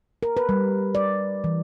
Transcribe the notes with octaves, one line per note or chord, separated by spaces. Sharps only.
A#4
B4
G3
D5
E3